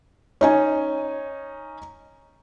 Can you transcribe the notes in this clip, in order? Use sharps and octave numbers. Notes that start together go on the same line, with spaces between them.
C#4 D#4 G#5